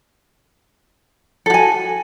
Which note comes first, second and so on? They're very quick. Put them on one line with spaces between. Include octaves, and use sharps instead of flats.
A4 F#4 G#5